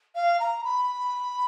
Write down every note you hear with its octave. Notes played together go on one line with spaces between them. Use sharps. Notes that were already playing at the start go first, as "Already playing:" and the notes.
F5
A#5
B5